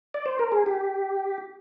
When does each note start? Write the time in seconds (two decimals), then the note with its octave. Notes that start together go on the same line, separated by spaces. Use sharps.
0.14 D5
0.26 C5
0.39 A#4
0.52 G#4
0.66 G4